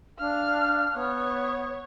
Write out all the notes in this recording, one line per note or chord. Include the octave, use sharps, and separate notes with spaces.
D4 F5 F6
B3 C#5